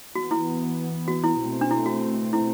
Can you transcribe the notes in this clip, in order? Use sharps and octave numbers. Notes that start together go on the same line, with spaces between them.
E3 B3 F#4
E4
F#4
E4
B2 A3 C4
D4
E4
F#4
E4